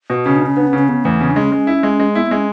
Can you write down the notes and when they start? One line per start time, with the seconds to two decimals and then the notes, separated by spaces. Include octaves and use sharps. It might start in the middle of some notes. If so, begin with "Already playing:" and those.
0.10 B2
0.25 C#3 C#4
0.36 D4
0.41 C#3
0.46 C#4
0.56 B3 D4
0.67 C#4
0.73 C#3
0.78 C#4
0.89 C#3 B3
1.04 E2 A3
1.20 C#3 B3
1.31 D4
1.36 G#3
1.42 C#4
1.52 G#3
1.67 E4
1.83 G#3
1.99 G#3
2.15 B3 E4
2.26 B3
2.31 G#3
2.37 C#4